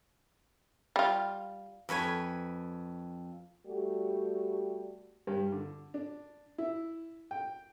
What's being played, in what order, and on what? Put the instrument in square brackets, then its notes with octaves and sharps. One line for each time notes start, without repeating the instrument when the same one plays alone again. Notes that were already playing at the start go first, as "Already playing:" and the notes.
[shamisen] G3 F4
[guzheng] F2 B4 C#5 G#5
[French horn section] G3 A3 F#4 G4
[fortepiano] G2
D3
D4
E4
G5